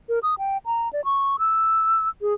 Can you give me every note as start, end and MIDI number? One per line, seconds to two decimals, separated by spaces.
0.09 0.19 70
0.23 0.35 87
0.38 0.58 79
0.66 0.91 82
0.93 1.04 74
1.05 1.37 85
1.39 2.09 88
2.21 2.33 68